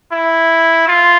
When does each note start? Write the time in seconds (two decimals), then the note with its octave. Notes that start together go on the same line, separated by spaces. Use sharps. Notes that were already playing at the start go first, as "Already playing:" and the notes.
0.12 E4
0.87 F4